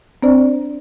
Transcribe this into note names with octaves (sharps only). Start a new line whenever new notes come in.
C4 D4 C5 D5